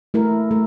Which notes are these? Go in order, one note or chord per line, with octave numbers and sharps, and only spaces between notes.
A3 E4 A#4
A3